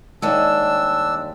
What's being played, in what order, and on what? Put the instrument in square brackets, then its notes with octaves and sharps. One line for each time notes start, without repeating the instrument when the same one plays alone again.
[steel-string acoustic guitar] D#2 G3 G#3 [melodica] D4 E6